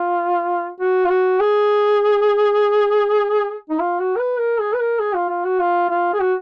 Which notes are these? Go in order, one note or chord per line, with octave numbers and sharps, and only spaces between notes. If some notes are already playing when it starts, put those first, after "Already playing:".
Already playing: F4
F#4
F4
F#4
G#4
D#4
F4
F#4
A#4
B4
A#4
G#4
B4
A#4
G#4
F4
F4
F#4
F4
F4
G#4
F#4